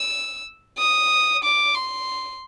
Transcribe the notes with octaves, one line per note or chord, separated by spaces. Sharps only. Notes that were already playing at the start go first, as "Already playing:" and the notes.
Already playing: E6
D#6
D6
C6